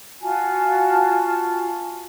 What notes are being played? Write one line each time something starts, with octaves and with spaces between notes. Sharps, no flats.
F4 F#4 G#5 A5